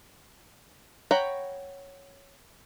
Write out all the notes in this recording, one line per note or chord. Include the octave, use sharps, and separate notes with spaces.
C#5 F#5 G5 A#5 B5